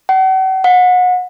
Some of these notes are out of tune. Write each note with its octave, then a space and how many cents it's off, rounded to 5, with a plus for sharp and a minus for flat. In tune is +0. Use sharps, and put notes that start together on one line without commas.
F#5 +45
F#5 -30